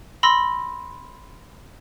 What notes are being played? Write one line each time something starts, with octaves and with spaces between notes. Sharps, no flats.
B5 C6 E6 A#6